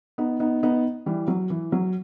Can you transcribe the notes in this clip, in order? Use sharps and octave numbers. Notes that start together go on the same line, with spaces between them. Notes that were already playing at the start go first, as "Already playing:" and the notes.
B3 D#4
B3 D#4
B3 D#4
E3 G3
F#3
E3
F#3